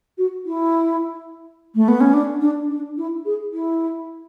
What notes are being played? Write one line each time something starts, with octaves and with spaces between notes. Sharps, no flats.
F#4
E4
A3
B3
C#4
D4
D4
D4
E4
G#4
E4